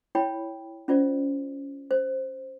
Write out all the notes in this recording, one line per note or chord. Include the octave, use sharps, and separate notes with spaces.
E4 C#5 G5 B5
C#4 F4 C5 D5
C5